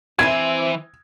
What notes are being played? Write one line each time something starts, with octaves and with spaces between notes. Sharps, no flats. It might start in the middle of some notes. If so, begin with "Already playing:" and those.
E3 C4 D#4 E4 G#5 G#6